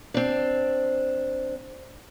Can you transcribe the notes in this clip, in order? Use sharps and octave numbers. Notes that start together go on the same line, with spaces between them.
C4 D4